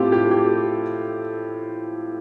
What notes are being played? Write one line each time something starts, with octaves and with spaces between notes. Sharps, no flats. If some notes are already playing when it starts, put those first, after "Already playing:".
Already playing: A2 A3 C4 F4 G4 A4
G4
G4